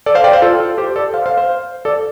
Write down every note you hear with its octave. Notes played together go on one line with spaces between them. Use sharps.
A4 D5
C5 F5
D5 G5
C5 F5
F4 A4
F4 A4
G4 C5
A4 D5
C5 F5
C5 F5
C5 F5
A4 D5